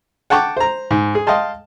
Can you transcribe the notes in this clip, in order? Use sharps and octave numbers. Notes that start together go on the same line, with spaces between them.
F#5 G5 A5 C#6 D6
C5 A#5
G#2
G#4
D#5 F5 G5 A5 C6